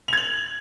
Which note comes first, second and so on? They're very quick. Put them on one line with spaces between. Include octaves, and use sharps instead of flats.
F7 G#6 F#7